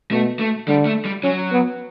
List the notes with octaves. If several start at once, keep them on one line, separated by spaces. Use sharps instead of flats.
B2 A3
A3
D3 G3
A3
G3
F#3 C#4
B3